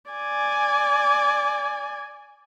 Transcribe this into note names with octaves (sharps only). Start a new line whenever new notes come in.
D5 G#5